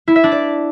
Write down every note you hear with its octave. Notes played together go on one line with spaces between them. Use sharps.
E4
E5
D4
D5